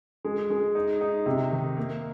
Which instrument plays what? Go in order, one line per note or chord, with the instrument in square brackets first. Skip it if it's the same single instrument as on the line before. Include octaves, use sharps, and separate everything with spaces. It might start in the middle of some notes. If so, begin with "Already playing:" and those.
[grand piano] G#3
G#3
D#4
D#4
C3
D#3
A#3